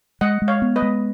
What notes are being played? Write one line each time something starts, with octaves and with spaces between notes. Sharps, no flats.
G#3 D#5 F#5
G#3
C#5 F5
B3
B4 D#5
G#3